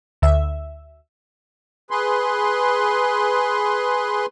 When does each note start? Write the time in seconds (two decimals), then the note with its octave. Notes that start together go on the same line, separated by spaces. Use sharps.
0.22 D2 E5
1.91 G#4 B4 C6